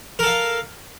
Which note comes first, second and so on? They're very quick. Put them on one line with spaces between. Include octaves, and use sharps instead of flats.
A#4 A4 F5